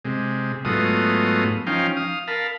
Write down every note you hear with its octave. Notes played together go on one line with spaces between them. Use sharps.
C3 G#3
G#2 F#3 A3 B3 F4 D#6
F3 C#4 D#4 F5 G5
F5 D#6
A#4 F5 A5 B5